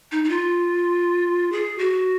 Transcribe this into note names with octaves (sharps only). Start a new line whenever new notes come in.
D#4
D#4
F4
G#4
F#4